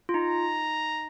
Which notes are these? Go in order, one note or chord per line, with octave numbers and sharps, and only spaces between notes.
F4
D#4 A#5